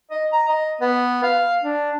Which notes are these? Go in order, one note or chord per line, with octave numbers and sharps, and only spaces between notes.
D#5
A#5
D#5
B3
F5
D4